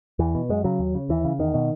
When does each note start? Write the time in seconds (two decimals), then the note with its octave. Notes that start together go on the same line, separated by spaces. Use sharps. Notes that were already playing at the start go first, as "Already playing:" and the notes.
0.19 E2 E3
0.35 B2
0.49 F#2 G#3
0.64 C#3 F#3
0.79 D#2
0.95 C#3
1.09 D#2 E3
1.25 C#3
1.39 E2 D#3
1.54 B2